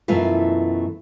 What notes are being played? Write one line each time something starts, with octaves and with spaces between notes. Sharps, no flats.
F#2 B2 E3 A3 F4 B4